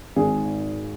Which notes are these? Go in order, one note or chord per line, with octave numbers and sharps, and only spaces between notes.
G#1 G#2 D#3 G#4